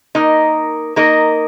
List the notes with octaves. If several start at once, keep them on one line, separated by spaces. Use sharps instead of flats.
A#3 D#4 A#4 D#5
A#3 D#4 A#4 D#5